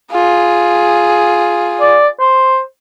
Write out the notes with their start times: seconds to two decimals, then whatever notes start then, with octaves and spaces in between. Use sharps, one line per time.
0.12 F4 G#4
1.81 D5
2.20 C5